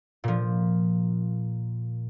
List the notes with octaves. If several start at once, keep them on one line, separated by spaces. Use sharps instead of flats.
A#2 F3